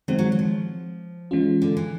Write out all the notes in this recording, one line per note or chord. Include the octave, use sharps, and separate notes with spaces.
D#3 F#3 G#3 C4
F#3
F#3
F3
E3 G#3 C#4 F4
D3
E3